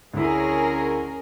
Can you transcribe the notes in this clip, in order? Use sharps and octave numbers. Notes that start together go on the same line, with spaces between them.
D2 C#4 E4 G#4 A#4